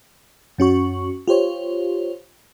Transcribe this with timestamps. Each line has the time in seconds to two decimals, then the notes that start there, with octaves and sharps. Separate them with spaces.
0.58 F#2 C#4 F#4 C#6
1.28 F4 G4 C5 C#5